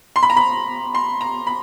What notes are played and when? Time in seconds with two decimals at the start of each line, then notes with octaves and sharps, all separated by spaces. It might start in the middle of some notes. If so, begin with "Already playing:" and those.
0.16 C6
0.23 B5
0.30 A#5
0.37 B5
0.95 C6
1.21 A#5
1.47 B5